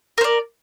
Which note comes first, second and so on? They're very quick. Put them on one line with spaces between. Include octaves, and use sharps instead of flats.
A#4 C5 D5